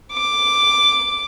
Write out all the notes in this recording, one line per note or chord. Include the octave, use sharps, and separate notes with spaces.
D6